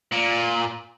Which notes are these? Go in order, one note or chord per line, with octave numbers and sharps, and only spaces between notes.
A#2